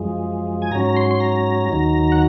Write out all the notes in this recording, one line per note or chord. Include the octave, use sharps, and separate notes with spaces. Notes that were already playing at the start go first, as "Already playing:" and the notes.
Already playing: F#2 F3 G#3
G#5
G#2 F#3 C#4 A#5
A#5
C6
C6
A#5
D#2 D#3 F#3
F#5